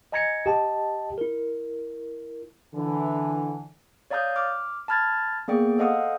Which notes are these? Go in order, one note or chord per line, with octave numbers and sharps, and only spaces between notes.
D#5 G#5 A#5 G#6 A#6 C#7
G4 D#5 G5 A5
E4 A#4
D3 E3
C#5 D5 F5 A#5 D#6 G6
D6 F6
A5 B5 F6 G#6 A6
A#3 B3 G#4 D5 G5
A4 C5 D#5 F5 F#5 D#6